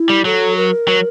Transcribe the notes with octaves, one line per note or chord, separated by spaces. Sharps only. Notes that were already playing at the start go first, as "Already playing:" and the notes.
Already playing: E4
G3
F#3 A4
A#4
F#3